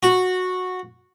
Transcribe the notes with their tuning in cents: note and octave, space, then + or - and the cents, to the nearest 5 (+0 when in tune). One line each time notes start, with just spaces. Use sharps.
F#4 -10